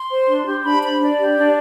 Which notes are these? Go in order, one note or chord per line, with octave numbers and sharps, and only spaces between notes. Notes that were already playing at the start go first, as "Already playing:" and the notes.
Already playing: C6
C5
D4
G4
D4 B5
C5 B5
D4 D5
G4
D4